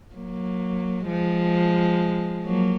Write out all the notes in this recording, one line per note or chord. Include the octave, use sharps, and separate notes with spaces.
F#3 A#3
F3 G#3
F#3 A#3